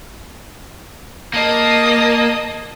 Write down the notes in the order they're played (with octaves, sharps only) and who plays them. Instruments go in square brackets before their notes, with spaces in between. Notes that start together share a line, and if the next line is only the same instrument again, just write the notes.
[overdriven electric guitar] A#3 [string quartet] D#5 A5 D#6